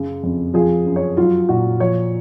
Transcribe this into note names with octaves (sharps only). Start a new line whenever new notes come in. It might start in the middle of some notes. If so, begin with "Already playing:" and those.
Already playing: F#2 C#3
F2
F3 G#4
F#2
C#5
F#3 F4
A#2 F#4
F3 C#5